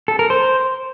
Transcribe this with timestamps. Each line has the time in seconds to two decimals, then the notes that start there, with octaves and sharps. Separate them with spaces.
0.08 A4
0.19 A#4
0.30 C5